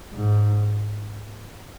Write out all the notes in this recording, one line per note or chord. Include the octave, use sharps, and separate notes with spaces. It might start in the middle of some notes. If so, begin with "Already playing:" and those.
G#2